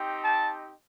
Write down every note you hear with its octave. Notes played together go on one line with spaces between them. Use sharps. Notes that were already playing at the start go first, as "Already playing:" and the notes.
Already playing: C4 D#4 G4
A5